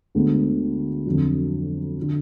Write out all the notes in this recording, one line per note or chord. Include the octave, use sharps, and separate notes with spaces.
D2 D3 G#3 B3
F2 D3 F#3
D3